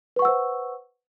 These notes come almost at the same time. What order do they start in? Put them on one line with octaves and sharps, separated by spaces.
B4 C#6 F#5 E6 C5